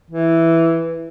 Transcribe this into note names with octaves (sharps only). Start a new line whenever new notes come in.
E3